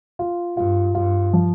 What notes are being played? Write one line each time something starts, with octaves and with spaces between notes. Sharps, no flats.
F4
G2 F4
G2 F4
F3